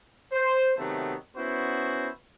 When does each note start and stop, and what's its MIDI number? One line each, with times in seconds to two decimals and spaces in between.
0.32 0.74 72
0.78 1.15 48
0.78 1.15 51
0.78 1.15 54
0.78 1.15 57
0.78 1.15 59
1.37 2.09 59
1.37 2.09 61
1.37 2.09 64
1.37 2.09 66
1.37 2.09 72